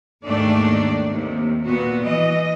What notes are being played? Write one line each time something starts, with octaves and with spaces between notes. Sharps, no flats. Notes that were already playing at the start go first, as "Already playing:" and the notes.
D#2 G#2 D#3 A3 D4 D5
D#2 C3
A#2 B3 F#4
E3 D#5